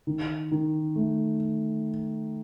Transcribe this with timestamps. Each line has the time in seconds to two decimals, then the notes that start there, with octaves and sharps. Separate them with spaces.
0.07 D#3
0.51 D#3
0.96 A3